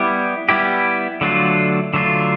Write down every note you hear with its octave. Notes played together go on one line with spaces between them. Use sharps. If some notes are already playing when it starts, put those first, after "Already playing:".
Already playing: G3 B3 E4 G4
G3 B3 E4 G4
D3 F#3 A3 D4 F4
D3 F#3 A3 D4 F4